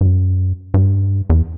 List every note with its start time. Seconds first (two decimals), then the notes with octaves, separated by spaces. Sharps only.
0.01 G2
0.05 F#2
0.74 G2
1.30 E2